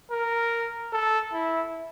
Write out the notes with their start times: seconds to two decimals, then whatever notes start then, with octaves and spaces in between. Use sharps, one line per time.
0.12 A#4
0.92 A4
1.33 E4